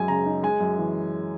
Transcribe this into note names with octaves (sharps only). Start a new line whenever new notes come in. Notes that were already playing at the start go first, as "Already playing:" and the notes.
Already playing: F#2 G#3 G#5
C#3 A#5
D#4
G#3 G#5
F#2
E3